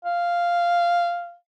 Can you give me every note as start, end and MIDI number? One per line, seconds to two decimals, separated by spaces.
0.05 1.34 77